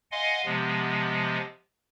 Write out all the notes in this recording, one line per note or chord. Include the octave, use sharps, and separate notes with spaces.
D#5 F5 F#5 G#5 C6
C3 F3 G#3 B3